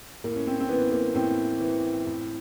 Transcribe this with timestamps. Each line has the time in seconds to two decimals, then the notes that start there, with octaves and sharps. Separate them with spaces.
0.24 A2 A#3
0.36 C#4
0.47 C4
0.60 C4
0.69 E3 B3
0.92 A#3
1.15 A2 C4
1.60 E3
2.06 A2